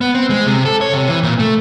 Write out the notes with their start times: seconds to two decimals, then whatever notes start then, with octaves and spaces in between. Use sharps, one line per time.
0.01 B3
0.14 C4
0.30 G#3
0.47 C3
0.65 A4
0.81 C#5
0.94 C3
1.08 E3
1.23 A#2
1.39 A3